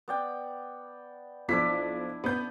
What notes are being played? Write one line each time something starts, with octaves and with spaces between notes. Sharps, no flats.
B3 D5 G5
B1 F3 D4 E4 D5 B6
B3 G6